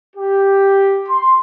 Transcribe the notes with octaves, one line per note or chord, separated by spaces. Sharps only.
G4
C6